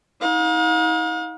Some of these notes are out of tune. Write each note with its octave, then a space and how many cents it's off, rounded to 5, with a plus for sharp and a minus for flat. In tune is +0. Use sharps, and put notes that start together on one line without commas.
D#4 +45 F5 +45